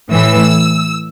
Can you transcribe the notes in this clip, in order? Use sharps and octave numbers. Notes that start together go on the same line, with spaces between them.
A2 E3 E6